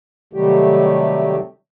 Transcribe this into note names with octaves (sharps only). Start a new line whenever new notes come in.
C3 D#3 F#3 G3 A3 G4